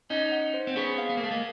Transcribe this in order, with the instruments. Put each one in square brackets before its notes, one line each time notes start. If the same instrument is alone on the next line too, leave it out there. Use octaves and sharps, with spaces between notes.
[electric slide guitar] C#4 D#4 [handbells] D#5
[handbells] F#5
C5
[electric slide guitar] C4
[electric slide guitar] B3 C#4 [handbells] G#4
[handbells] F5
[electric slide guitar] B3
A#3
[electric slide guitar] A3 [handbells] F5
[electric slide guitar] G#3 A#3